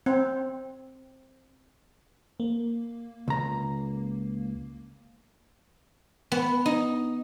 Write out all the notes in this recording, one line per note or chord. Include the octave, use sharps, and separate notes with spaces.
C4
A#3
C#2 A#5
B3
D#4